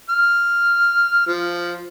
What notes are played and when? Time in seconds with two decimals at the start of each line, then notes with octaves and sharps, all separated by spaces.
0.10 F6
1.27 F3